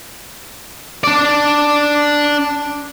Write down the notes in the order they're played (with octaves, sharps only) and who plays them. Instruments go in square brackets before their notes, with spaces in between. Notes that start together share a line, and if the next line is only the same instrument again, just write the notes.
[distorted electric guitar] D4 D5